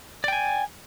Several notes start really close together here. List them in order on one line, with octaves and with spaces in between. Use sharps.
D5 G5 G#5